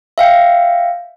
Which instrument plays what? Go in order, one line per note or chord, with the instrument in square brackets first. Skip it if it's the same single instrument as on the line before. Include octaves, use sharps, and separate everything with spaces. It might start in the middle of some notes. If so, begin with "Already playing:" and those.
[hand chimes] E5 F5 G5